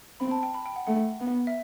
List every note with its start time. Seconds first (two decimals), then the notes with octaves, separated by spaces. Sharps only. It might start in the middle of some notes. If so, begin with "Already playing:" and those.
0.20 C4 B5
0.31 A5
0.43 G5
0.55 B5
0.66 G5
0.76 F#5
0.87 A3 F#5
1.20 B3
1.47 E5